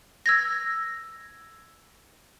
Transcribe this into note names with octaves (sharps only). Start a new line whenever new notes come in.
E6 G#6 A#6